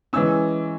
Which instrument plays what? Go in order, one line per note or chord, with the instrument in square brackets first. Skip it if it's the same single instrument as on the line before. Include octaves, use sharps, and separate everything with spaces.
[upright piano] E3 G#3 C#4 E6